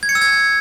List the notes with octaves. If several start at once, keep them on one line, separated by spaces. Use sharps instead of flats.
G#6
C#7
E6
G#6